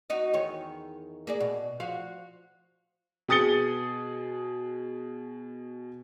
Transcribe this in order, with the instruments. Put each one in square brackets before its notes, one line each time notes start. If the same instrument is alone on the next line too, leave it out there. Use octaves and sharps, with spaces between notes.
[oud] D#4 F#4 D#5
E2 D#3 C#5
A#3 G#4 D5
B2
F3 F#4 F5
[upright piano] B2 G#4 D#6 A6 C#7 G7